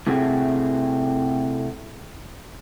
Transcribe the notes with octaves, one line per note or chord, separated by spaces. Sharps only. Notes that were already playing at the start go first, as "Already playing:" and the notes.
A2 C3 A3 C4 F#4 G#4